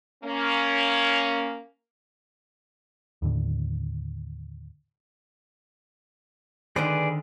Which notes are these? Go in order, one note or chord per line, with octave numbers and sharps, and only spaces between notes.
A#3 C#4
D#2 A2 D3
D3 D#3 G#4 B4 C5 D5